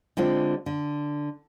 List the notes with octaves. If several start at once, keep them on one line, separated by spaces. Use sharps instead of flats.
D3 G#3 C4 F4
D3